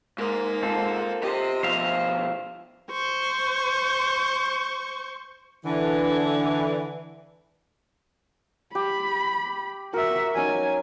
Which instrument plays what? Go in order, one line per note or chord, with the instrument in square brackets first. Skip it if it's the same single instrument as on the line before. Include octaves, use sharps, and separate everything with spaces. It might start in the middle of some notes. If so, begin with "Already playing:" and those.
[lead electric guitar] G#2 [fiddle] A#3
[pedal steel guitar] C4 F4 A4
[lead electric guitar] G4 C5 [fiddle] D#5
[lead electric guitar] B2 F3 [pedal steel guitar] C5 E5 F5
[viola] C5 C#6
[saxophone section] D3 E3
[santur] G4 [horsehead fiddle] B5
[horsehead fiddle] F#4 E5 [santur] A#4
[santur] F#3 C#4 D#4 [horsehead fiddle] G#5